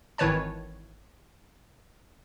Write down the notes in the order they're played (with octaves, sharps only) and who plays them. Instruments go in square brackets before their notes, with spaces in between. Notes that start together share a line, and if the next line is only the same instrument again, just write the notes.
[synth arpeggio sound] G#1 D#3 E3 B4 C#5 A5